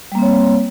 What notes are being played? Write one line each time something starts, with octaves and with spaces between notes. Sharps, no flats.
G3 A#3 C4 C#5